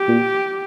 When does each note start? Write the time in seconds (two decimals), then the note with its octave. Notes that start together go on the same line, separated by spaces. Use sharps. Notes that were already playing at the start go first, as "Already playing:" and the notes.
Already playing: G4
0.08 A#2